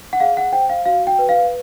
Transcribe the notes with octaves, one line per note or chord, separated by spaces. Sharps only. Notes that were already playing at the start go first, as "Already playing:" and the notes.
F#5
G#4 F5
F#5
C5 G5
F5
F#4 F5
G5
B4
F5